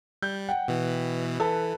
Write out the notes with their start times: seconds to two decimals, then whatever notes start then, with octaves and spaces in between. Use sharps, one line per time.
0.22 G3 G6
0.49 F#5 G5
0.68 B2 E3
1.40 E3 A4 B4